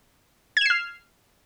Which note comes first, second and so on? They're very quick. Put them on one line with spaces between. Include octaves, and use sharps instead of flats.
G#6 E7 C7 F6